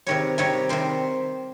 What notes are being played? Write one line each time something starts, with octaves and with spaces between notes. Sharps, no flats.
C3 D#3 G3 C#5
C3 D#3 G3 C#5
C3 D#3 G3 C5